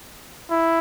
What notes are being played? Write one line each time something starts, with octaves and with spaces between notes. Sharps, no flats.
E4